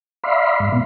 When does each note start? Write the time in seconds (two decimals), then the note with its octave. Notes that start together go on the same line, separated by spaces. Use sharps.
0.24 D5 E5 F5 B5 C6
0.60 G#2
0.72 B2